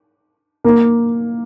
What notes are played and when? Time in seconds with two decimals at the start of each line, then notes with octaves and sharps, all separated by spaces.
0.64 A#3